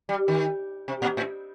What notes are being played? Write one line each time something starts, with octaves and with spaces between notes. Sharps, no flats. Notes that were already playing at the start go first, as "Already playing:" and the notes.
G3
D#3
C3
A#2
A2